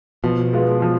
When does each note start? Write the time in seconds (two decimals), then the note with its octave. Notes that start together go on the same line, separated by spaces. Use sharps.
0.24 B2 F3
0.53 G#3 B3 F4
0.82 F3